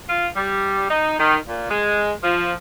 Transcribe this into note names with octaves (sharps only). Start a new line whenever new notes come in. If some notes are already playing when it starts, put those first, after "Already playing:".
F4
G3
D#4
D#3
A#2
G#3
F3